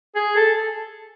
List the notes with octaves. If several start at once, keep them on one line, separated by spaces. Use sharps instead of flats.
G#4
A4